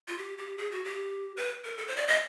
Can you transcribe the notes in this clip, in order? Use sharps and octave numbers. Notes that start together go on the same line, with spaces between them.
F4
G4
G4
G#4
F#4
G4
B4
A#4
A4
C5
D5
D#5